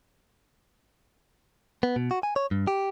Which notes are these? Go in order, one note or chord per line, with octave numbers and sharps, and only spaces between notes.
B3
B2
F#4
G#5
C#5
G2
G4